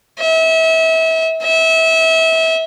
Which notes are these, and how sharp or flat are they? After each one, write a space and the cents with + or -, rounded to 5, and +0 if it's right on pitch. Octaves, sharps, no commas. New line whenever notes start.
E5 -30
E5 -25